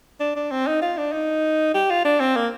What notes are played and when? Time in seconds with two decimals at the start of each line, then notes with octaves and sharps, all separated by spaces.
0.20 D4
0.36 D4
0.51 C4
0.67 D#4
0.82 F4
0.98 D4
1.13 D#4
1.74 G4
1.90 F4
2.05 D4
2.20 C4
2.36 A#3